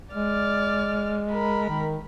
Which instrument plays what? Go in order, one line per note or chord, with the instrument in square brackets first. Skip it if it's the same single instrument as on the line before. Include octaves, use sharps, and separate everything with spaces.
[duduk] G#3 [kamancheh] D5 F6
[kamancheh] A#4 B5
[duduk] D#3